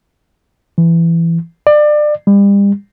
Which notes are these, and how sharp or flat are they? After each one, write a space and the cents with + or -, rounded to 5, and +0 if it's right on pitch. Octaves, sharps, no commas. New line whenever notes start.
E3 +15
D5 +30
G3 +35